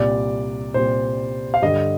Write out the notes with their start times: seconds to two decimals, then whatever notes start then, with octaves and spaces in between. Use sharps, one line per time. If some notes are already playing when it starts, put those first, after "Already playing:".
Already playing: C2 A#2 G3 D5
0.74 C2 A#2 G3 C5
1.54 F5
1.62 G2 D3 G3 D#5